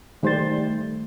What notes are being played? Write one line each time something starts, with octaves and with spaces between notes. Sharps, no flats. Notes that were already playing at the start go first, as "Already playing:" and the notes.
D#3 G3 A3 C5 A6